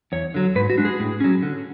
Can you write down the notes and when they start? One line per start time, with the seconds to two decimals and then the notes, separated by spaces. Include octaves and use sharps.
0.12 E2 C#5
0.34 D3 F#3
0.55 G#2 B4
0.70 F#4
0.78 G#3 D4
0.85 G#4
1.00 A2
1.20 F#3 C#4
1.43 D3